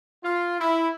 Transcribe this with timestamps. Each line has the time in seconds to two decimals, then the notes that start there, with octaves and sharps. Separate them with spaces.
0.23 F4
0.60 E4